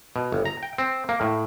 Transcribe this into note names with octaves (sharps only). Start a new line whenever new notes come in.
B2
G1
A#5
G5
C4
A#3
A2